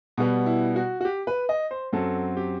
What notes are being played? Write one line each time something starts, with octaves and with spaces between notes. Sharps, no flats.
B2 G3 B3
E4
F#4
F#4
G4
B4
D#5
C5
F#2 F#3 C4 A4
G4